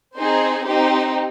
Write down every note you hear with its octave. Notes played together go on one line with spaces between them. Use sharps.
C4 D#4 G#4 C5
C4 D#4 G4 C5